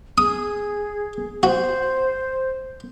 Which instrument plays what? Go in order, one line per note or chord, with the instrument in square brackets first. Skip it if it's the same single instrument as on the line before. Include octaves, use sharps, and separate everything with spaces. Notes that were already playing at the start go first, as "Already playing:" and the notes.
[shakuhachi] G#4 [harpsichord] D#6
[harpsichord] F#4 [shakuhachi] C5